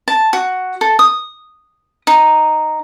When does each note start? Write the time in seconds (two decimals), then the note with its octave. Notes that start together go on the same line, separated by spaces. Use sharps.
0.08 A5
0.33 F#4
0.81 A4
0.99 D#6
2.07 D#4